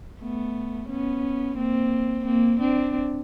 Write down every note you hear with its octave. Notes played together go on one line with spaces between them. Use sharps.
A3 B3
B3 C#4
A#3 C4
A#3 C4
C4 D4